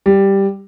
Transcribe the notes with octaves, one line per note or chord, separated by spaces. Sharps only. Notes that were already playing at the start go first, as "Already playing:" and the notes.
G3